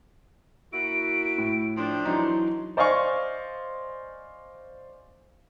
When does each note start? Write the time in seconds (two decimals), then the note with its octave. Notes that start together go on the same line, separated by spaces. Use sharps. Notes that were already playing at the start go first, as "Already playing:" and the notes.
0.73 A#3 E4 F#4 D7
1.38 A2
1.78 F3 A3 D4 G5
2.05 E3 F#3 D#4 C6
2.77 C5 D5 D#5 F5 G#5 C#6